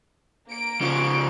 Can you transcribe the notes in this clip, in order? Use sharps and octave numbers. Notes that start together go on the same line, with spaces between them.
A#3 D7
C#3 F3